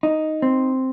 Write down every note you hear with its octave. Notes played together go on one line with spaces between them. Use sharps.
D#4
C4